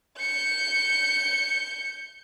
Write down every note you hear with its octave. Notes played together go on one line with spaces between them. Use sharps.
G6 C#7